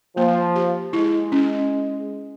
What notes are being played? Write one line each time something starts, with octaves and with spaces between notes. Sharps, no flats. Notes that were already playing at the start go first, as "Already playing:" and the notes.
F3 A#3
G4
G#3 E4
C#4